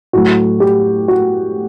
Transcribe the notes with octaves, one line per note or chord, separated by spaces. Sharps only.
A2 F#3 A3 F#4
G4
F#4